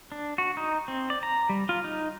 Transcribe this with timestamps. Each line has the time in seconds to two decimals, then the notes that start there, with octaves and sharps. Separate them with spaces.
0.12 D4
0.38 F#4
0.57 D#4
0.88 C4
1.10 D5
1.23 A#5
1.49 G3
1.69 F4
1.84 D#4